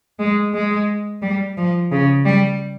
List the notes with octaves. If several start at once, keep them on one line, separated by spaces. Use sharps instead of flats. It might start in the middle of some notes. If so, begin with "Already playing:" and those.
G#3
G#3
G3
F3
C#3
G3